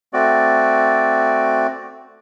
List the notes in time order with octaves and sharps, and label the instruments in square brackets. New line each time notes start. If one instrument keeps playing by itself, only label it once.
[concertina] A3 C4 F#4 D5